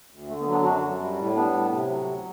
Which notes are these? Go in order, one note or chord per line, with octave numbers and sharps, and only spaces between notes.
D2
D3 A3
B3
F#3
B3 D4
F#2 D4 F#4
F#2
G3
A2
G3 B3 D4
A2
C3
F#3
D2